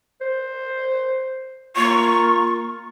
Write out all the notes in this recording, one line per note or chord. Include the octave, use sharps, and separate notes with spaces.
C5
A#3 F4 C#6